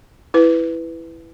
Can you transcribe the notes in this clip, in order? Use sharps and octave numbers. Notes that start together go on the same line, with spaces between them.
E4 B4